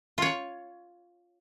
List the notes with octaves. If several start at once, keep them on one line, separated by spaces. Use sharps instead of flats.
F4 C#5